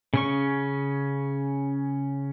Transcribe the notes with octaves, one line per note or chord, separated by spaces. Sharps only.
C#3 C#4 C#6